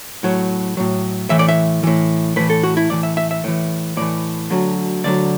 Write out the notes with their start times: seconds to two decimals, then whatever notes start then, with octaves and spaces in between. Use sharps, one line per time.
0.23 A2 F#3
0.77 A2 F#3
1.29 A2 E3 E5
1.39 D5
1.49 E5
1.83 A2 E3
2.36 A2 E3 B4
2.50 A4
2.63 F#4
2.77 E4
2.90 A2 E3 D5
3.03 E5
3.17 E5
3.31 E5
3.44 A2 E3
3.97 A2 E3 D5
4.50 D2 D3 F#3
5.04 D2 D3 F#3 D5